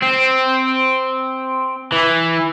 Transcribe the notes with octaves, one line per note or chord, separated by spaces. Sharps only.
C4
E3